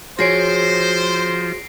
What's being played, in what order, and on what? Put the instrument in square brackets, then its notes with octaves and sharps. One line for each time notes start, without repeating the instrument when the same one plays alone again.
[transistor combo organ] F3 [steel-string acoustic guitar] F#4 G#4 C#5 [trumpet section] C5 [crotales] A#6 C7 D7